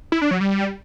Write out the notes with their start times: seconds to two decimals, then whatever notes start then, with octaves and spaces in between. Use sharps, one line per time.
0.12 E4
0.22 D4
0.31 F#3
0.41 G3